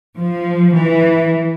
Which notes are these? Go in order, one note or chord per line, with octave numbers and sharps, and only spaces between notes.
F3
E3